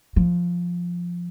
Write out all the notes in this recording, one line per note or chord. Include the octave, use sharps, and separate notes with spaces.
F3